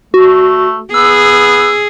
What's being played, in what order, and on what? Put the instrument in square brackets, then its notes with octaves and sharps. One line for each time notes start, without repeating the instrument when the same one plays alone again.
[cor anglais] A3 [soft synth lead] F#4
[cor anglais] B3 [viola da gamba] G#4 [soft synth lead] E6